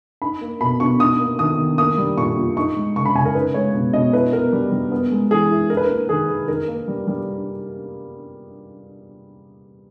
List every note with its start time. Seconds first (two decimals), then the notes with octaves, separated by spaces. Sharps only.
0.22 D#4 B5
0.41 A#3
0.61 B2 B5
0.80 B2 C#6
1.00 D#4 D#6
1.20 A#3
1.39 D#3 D#6
1.59 D#3
1.78 A#3 D#6
1.98 G3
2.18 A#2 C#6
2.37 A#2
2.56 D#4 C#6
2.76 G#3
2.96 C#3 C#6
3.06 B5
3.15 C#3 G#5
3.25 A#4
3.35 D#4 B4
3.54 G#3 C#5
3.74 B2
3.93 B2 D#5
4.13 E4 B4
4.33 B3 A#4
4.53 G3
4.72 G3
4.92 B3
5.12 G#3
5.31 E3 G#4
5.50 E4
5.70 E4 A#4
5.77 B4
5.85 A#3 A#4
6.09 D#3 G#4
6.29 D#3
6.48 D#4 A#4
6.68 A#3
6.88 G3
7.08 G3